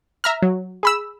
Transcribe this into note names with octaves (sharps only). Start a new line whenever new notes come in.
E5 A#5 F6
F#3
G#4 B5 E6